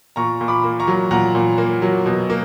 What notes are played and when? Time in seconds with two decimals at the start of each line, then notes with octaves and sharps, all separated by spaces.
0.16 A#2 A#5 C#6
0.41 A#2
0.48 B5 D6
0.64 A#3
0.80 A#5 C#6
0.87 F#3
1.11 A#2 F#5 A#5
1.35 A#2
1.58 A#3
1.82 F#3
2.06 B2
2.30 A#3